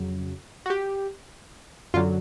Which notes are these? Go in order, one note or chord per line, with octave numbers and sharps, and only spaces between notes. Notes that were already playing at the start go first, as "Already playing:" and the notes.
Already playing: F2 C#3 F#3
F#4
G4
F#2 D3 F#3 F4